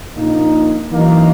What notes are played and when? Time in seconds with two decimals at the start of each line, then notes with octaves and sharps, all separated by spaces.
0.16 A#1 A#2 A#3 D#4
0.91 F#2 E3 A#3 D#4